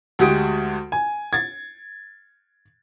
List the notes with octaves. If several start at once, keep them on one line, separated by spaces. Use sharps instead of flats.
D2 G#3 F#4 G4 D#6 D7
G#5
G#6 A6